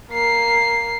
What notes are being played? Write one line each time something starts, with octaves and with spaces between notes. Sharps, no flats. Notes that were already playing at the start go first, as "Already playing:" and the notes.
A#3 C7